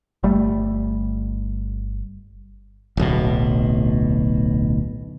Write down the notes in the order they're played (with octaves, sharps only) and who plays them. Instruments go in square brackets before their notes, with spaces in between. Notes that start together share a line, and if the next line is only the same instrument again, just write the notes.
[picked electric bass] G1 G3 A3
[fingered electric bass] D1 B1 B2